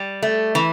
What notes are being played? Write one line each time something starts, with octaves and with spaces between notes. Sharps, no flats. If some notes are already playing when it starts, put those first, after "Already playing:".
Already playing: G3
A3
E3